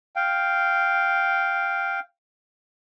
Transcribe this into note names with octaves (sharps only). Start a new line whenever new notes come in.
F5 G5